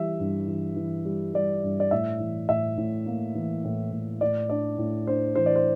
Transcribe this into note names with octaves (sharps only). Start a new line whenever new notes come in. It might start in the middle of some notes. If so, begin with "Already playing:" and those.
Already playing: E3 G3 E5
G2
E3
E3
G3
G3 D5
G2
D5
A2 E5
E3
A2 E5
A2
A#3
E3
A2
A2
A2 D5
D4 D5
A2
D4 C5
E3 C5
D5
C5